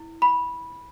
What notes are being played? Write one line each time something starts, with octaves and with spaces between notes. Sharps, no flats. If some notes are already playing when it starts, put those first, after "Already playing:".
Already playing: E4
B5